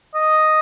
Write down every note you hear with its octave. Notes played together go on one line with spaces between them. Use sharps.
D#5